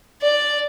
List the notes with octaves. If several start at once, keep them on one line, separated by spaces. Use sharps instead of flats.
D5